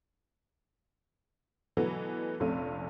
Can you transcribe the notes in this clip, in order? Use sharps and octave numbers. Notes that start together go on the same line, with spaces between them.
B2 D3 E3 F#3 A3 B3
F1 A#1 C3 A3 C#4 F5